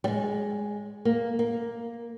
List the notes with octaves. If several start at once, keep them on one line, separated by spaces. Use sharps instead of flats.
G3
G#3
A#3
A#3